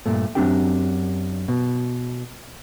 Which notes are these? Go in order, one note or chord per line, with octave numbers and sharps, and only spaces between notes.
G2 A#2 A3
F#2 G#3 C4 D4 G4 G5
B2